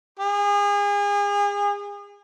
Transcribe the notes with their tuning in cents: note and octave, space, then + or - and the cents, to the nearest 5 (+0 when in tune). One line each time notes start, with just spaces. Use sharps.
G#4 -35